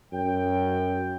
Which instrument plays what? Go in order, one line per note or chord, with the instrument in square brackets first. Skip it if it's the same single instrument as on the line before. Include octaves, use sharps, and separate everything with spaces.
[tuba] F#2 [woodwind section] G5